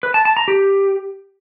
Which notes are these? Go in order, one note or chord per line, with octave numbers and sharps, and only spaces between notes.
B4
A5
A5
A#5
G4